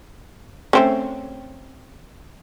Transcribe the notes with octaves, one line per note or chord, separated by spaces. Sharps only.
A3 C4 C#4